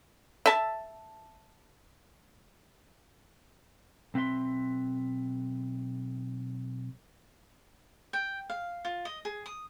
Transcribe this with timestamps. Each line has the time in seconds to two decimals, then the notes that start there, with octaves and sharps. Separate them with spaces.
0.46 E5 A5
4.14 B1 C4 B4 E5 C6
8.13 G5
8.50 F5
8.85 F4
9.05 D#5
9.25 G#4
9.46 D#6